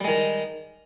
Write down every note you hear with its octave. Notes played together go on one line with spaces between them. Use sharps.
D#3 G3 G#3